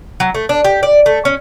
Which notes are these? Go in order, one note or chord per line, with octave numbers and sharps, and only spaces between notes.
F#3
A3
D4
G4
D5
A3
C#4